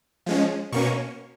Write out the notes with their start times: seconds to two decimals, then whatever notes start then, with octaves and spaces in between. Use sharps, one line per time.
0.26 F3 G#3 C#4
0.72 B2 A#3 C#4 C#6